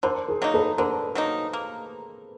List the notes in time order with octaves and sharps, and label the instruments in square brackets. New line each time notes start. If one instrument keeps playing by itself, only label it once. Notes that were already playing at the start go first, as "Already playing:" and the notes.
[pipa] D3 [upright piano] A#4 C5
[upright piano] G#4 A#4
[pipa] F#3 A#3 D#4
[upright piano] A4 B4
[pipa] D3 [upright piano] A#4 C5
[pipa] F#3 A#3 D#4
A#3